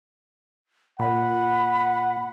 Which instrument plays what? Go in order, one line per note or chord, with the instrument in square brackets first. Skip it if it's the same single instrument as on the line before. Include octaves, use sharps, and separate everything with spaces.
[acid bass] A#2 [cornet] F#5 [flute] B5